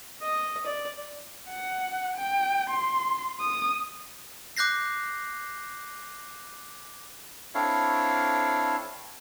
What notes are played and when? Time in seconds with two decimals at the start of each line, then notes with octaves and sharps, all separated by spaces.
0.22 D#5
0.66 D5
1.50 F#5
2.17 G5
2.70 C6
3.40 D#6
4.56 D6 F#6 G6 A#6 C7
7.55 C4 D4 E4 A4 C#5 F5